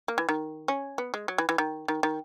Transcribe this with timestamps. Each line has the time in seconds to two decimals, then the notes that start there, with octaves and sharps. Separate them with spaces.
0.08 A#3
0.18 E3
0.29 D#3
0.68 C#4
0.98 B3
1.14 G#3
1.28 F#3
1.38 E3
1.49 E3
1.58 D#3
1.88 D#3
2.03 D#3